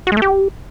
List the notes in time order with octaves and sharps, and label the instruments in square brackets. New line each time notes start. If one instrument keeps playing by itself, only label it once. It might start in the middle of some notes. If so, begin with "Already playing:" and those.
[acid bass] F#4
G#3
A3
G4